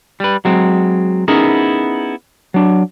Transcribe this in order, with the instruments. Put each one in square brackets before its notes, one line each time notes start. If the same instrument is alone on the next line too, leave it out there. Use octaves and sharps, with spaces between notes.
[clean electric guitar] G3 B4
F#3 G#3 C4
B3 C#4 D#4 E4 G#4 A#4
F#3 D4